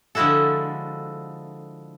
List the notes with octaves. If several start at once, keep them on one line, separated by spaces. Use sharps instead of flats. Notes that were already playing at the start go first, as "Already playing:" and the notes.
D3 F3 G#3 E4 F#4 A4